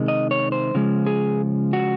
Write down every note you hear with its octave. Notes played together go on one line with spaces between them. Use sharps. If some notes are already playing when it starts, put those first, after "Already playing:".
Already playing: C3 D#3 G#3 D#4
D#5
C#5
C5
C#3 F3 G#3
G#4
F#4